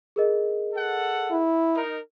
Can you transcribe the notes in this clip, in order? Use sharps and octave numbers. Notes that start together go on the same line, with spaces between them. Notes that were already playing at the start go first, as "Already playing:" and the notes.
G#4 A#4 D#5
A4 F#5
E4
D#4 A#4